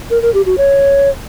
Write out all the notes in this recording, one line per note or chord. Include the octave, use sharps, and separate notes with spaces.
A#4
A#4
G4
F#4
C#5